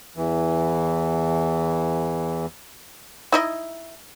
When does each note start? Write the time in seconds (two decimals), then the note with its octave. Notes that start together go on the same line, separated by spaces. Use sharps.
0.16 E2 E3
3.32 D#4 E4 D#5